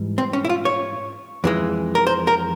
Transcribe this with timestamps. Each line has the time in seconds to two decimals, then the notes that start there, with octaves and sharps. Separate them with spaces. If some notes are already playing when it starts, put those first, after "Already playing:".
Already playing: G#2 E3 G3
0.18 C4
0.33 C#4
0.45 E4
0.49 F4
0.65 C#5
1.44 F2 E3 G#3
1.95 A#4
2.07 C5
2.27 A#4